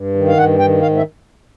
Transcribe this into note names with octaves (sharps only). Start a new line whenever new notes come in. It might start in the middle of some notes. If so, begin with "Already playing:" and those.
Already playing: G2
D#3
F5
G2 F#5
D#3 G5
G#2 F5
E5